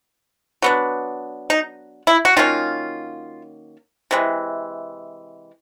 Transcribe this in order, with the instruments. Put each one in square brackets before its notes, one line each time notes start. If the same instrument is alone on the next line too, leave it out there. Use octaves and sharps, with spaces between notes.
[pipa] F#3 B3 D4
D#4
E4
F#4
D#3 F#3 A#3 C#4 F4
C3 E3 G#3